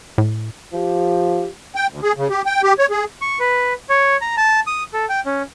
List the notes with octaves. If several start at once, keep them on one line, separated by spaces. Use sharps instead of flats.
A2
F3 G4
G5
D2
G#4
C#3
G4
G5
G4
C#5
G#4
C#6
B4
C#5
A#5
A5
D#6
A4
G5
C#4